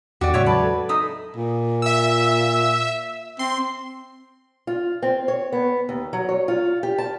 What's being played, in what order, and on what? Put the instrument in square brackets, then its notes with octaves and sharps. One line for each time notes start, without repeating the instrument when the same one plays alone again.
[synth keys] E2 D#3 [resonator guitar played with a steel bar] F#4 D5 [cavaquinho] G4
[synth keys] A2 C#3 G#3 [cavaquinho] C#5 E5 C#6
[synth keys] C#3 F#3 [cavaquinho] B4 A5
[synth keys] A4
[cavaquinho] D#4 E5 D#6
[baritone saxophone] A#2
[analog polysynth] E5 E6
[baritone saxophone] C4 [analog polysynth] C6
[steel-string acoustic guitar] F4
C4
C#5
B3
D#2
F#3
C#5
F4
G4
A5